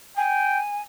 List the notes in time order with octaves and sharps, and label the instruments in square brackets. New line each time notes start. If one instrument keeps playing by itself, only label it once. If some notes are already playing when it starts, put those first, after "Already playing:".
[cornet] G5 [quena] G#5